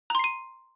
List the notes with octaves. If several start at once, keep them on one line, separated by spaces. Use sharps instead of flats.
A#5 C6 C7 D#7